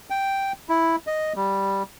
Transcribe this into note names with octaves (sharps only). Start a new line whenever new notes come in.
G5
E4
D#5
G3